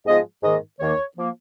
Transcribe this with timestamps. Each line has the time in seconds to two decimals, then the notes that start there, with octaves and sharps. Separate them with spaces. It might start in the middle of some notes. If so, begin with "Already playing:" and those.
0.06 G#2 F3 G#3 B3 D#5
0.42 G#2 D#3 A#3 D#5
0.79 D#2 D#3 A#3 C#5
1.16 F3 A#3